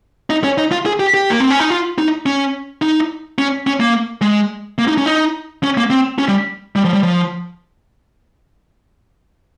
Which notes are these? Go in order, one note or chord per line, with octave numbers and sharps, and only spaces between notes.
D#4
C#4
D#4
F4
G#4
G4
G4
A#3
C4
C#4
D#4
F4
D#4
C#4
D#4
C#4
C#4
A#3
G#3
A#3
D#4
C#4
D#4
C#4
A#3
C4
C#4
G3
G3
F3
G3
F3